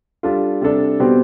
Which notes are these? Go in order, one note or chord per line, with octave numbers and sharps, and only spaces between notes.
G3 D4 F4 A4
C3 G3 D4 A4
B2 G3 C4 G4